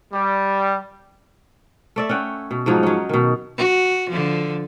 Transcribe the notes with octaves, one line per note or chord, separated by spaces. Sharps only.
G3
A3 D5 E5
C#4 F#5 G5
B2
G#2 F3 F#3 D#4
F#3 C#4
B2 D#3
F#4
D3 F3